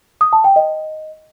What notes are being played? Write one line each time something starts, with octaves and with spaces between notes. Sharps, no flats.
D#6
A5
G5
D#5